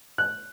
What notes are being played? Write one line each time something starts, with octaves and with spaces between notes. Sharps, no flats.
F#6